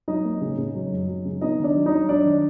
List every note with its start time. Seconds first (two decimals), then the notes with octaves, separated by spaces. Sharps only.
0.08 F#3 D#4 D#5
0.25 A#3
0.41 C#3
0.58 C#3
0.75 F#3
0.92 F#2
1.08 F#3
1.25 C#3
1.41 B3 D#4 D#5
1.59 D#3
1.64 D4 D5
1.75 F#3
1.86 D#4 D#5
1.91 F#3
2.08 F#3 D4 D5
2.25 D#3